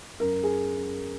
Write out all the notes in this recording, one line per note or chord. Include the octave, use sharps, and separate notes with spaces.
F#2 A#4
G#4